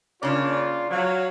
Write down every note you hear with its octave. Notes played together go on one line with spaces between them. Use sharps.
C#3 A#3 C#4 D4 F4 D5
F#3 F5